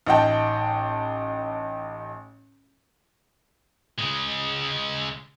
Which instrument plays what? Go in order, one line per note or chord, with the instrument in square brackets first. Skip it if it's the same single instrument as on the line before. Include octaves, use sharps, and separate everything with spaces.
[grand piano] A1 D#4 F#5 G5 A5
[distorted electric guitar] C#3 G#3